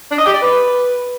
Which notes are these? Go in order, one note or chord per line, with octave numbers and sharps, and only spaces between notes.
D4
D#5
G4
D5
B4